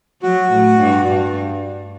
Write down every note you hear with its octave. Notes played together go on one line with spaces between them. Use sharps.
F#3 F#4
A2
G2
G2